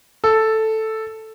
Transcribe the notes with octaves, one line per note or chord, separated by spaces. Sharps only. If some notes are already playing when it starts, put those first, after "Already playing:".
A4